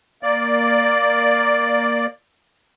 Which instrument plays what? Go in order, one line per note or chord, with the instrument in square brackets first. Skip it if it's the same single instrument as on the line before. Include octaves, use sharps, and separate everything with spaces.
[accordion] A#3 D5